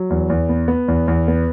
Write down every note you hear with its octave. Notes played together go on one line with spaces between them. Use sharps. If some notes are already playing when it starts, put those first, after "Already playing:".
Already playing: F#3
E2
E2
B3
B3
E2
E2
B3